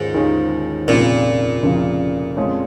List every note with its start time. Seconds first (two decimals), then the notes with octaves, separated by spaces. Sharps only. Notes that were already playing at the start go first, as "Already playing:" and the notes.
Already playing: D#2 G#2 D#3 C#4 F4
0.14 D#2 D#3 C#4 F4 G#4
0.88 F1 F2 A#2 C#3 A#3
1.62 F1 F2 C#3 A#3
2.37 F2 F3 G#3 C#4